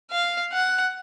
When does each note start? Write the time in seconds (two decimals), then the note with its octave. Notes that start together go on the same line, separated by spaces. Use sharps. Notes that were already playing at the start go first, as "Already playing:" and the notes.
0.12 F5
0.53 F#5